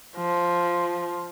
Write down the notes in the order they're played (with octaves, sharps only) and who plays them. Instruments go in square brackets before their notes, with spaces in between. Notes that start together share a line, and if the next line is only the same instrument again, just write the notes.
[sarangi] F3